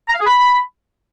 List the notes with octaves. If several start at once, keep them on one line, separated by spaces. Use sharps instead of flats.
A#5
F5
G#4
B5